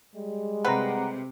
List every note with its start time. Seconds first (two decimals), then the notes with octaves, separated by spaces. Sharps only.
0.16 G3 G#3
0.65 C3 A3 C4 B4 F#5 A#5